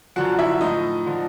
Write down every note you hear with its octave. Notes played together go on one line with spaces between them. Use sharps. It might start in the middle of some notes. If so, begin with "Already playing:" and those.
F#2 D3 F3 F#4 F#5
E4 E5
A2 F3 D#4 D#5
D3 F3